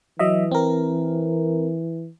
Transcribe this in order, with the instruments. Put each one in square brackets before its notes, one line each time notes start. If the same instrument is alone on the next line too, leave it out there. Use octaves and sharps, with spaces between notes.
[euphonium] E3 [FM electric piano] F#3 D#5 E5
[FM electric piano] C4 A#4